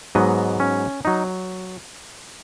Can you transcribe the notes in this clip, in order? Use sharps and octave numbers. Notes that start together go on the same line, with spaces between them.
G#2 F#3 B3 D#5
C#4
F#3 D#4